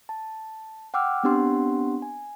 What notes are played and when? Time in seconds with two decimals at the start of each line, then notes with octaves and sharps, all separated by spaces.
0.09 A5
0.94 F#5 G5 D6 E6 F6
1.23 B3 C4 D4 G4 F#5 C6
2.02 G#5